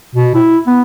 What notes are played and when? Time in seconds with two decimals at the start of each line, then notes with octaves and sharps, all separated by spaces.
0.15 B2
0.34 E4
0.67 B3